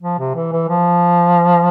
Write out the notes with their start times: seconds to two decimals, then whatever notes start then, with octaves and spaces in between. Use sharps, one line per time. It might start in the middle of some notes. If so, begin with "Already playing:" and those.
0.02 F3
0.19 C3
0.35 E3
0.52 E3
0.69 F3